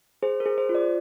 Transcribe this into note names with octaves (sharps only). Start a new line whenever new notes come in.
G#4 C5
A#4
G#4
C5
F4
D5